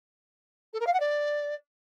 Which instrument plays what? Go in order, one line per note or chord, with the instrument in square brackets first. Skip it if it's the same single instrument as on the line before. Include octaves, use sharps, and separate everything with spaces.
[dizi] A4
A#4
F5
F#5
D5